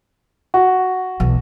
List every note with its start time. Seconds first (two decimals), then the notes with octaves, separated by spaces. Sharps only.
0.54 F#4
1.20 B1 E3